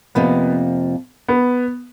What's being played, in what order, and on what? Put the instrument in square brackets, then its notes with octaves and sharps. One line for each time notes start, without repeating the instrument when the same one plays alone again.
[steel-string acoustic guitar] F2 C3 F3 A#3 [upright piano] B3
[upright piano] B3